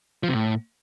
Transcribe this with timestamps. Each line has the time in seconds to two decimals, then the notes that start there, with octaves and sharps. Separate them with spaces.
0.23 F3
0.28 C3
0.33 A2